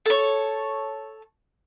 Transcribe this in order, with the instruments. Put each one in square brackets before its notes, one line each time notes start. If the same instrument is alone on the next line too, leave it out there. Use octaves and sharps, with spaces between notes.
[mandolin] A4 C#5